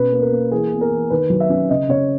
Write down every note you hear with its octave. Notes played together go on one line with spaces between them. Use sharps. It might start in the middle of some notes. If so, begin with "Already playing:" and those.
Already playing: B2 C#4 B4
A#3
A#4
A#3
E3 G#4
B3
A#4
E3
D#3 B4
F#3
E5
C#4
C#3 D#5
C#3 C#5